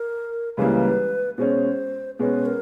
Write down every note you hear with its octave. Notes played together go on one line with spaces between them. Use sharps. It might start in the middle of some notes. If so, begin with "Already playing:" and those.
Already playing: A#4
C#2 C#3 E3 G3 A#3 B4
B2 G#3 C#4 C5
B2 G#3 C#4 B4
A#4